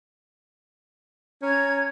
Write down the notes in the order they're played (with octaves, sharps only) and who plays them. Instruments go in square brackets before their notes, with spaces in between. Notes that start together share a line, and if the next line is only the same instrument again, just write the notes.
[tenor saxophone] C#4 [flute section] A#5 G#6